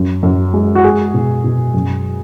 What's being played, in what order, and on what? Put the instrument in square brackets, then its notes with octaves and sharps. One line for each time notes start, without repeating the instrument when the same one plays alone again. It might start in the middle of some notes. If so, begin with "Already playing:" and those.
Already playing: [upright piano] F#2
F#2
G#3
F#4
G#3 G#4
B2
B2
F#2